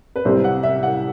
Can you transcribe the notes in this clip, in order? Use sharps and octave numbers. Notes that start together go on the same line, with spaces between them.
B4
C2 C3 G3 C5
F#5
E5
F#5